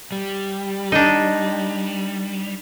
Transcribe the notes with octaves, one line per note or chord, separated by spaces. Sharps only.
G3
D4 D#4